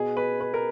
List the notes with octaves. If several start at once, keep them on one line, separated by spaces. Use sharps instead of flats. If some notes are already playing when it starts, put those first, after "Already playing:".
Already playing: B2 G#4
B4
B4
A#4